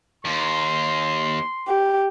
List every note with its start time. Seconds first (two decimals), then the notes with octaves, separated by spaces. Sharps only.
0.25 D#2 C6
1.68 G4